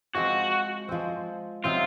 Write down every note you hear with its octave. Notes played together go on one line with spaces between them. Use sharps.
F3 G#3 C4 F#4
F3 G#3 C4
C3 F#3 C4 D#4 F4